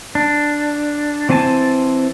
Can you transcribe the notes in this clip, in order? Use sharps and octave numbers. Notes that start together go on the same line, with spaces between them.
D4
E3 C4 C5 G#5 A5